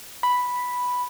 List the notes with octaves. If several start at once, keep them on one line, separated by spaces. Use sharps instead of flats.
B5